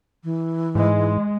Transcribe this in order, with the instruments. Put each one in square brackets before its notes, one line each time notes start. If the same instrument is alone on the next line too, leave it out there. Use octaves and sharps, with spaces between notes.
[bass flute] E3
[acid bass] G#2 [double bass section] G#3